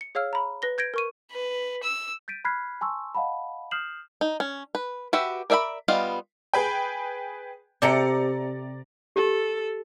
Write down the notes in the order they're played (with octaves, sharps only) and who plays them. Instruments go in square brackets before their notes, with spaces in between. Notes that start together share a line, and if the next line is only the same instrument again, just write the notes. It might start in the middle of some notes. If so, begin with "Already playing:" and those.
[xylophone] C#7
G#4 C#5 F5 E6 F6
A#5 B5
B4 A#6 G7
G6 G#6 A#6 D7
A#4 C#6 D#7
[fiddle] B4
E6
[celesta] G6 A6 B6 D7 D#7
B5 F6 F#6 G#6 B6 C7
G#5 A5 C6 C#6 E6
D#5 F5 F#5 A5 B5
D#6 F6 G6 C7 E7 F#7
[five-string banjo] D#4
C#4
B4
F#4 G4 B4 E5
A#4 D5 E5 F#5 B5
G3 B3 F4 D#5 F5
[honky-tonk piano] G#4 B4 G5
[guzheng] C3 A4 G5 [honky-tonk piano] D5 A#5 C#7
[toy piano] G4 [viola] A4